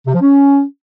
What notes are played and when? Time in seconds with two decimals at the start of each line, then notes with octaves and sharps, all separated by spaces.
0.06 C3
0.14 F3
0.21 C#4